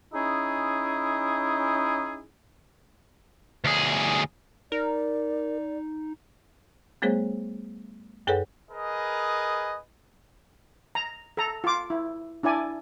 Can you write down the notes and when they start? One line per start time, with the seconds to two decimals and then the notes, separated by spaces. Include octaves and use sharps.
0.13 C#4 D#4 E4 G#4
3.65 D2 G#4
4.72 D#4 A#4 D5
7.02 G3 A3 B3 G#4 C5 C#5
8.27 F#2 G#4 A4 B4 C#5 F#5
8.71 G#4 A#4 B4 D#5
10.95 A#5
11.37 A4 A#5
11.64 F4 D6
11.90 E4
12.43 D4 E4 D5 G#5